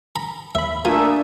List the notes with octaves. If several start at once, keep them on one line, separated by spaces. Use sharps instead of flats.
A#5 B5
D#2 E5 B5
A3 A#3 D4 F4 A#4 E5 G#5 D#6